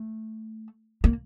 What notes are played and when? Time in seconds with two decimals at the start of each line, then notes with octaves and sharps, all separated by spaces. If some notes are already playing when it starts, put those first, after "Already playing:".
Already playing: A3
1.04 A#3